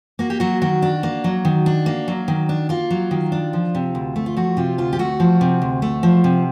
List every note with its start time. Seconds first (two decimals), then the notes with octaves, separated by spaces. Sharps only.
0.19 A#3 F#4
0.30 G4
0.40 F#3 F#4
0.62 D#3 F#4
0.82 D4
1.03 A#3
1.24 F#3
1.45 D#3
1.66 D4
1.86 A#3
2.08 F#3
2.28 D#3
2.49 D4
2.69 A#3 F4
2.90 F#3
3.11 D#3
3.32 D4
3.53 F3
3.75 C3
3.95 D2
4.16 A3
4.26 F4
4.37 F3 F#4
4.57 C3 F4
4.78 D2 F4
4.93 G4
4.99 A3 F#4
5.20 F3
5.41 C3
5.62 D2
5.82 A3
6.03 F3
6.24 C3